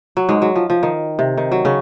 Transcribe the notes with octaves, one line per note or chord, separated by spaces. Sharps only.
F#3
G#2 G#3
F#3
F3
F3
D#3
C3
D#3
F#3
C#3 C#4